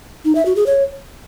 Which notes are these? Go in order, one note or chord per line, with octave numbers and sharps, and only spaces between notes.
D#4
E5
F#4
G#4
C#5